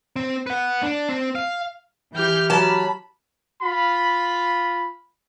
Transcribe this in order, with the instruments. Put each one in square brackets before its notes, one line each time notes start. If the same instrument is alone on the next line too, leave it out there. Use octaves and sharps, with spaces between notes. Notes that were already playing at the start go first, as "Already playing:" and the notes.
[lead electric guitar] C4
B4 F#5
D4
C4
F5
[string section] E3 G6 [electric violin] G4 F6
[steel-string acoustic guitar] F#3 A5 [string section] B5
[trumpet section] F4 B5